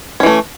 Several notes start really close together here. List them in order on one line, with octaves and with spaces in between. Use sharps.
C#4 E3 A3